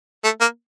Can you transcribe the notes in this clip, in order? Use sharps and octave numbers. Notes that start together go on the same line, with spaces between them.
A3
A#3